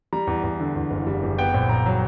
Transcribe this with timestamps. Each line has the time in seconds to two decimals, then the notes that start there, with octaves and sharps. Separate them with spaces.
0.13 G3 A#5
0.27 E2
0.43 E2
0.60 D3
0.75 E2
0.91 F#1
1.07 G3
1.23 F#1
1.38 B3 G5
1.54 A#1
1.69 A#1 A#5
1.86 F#3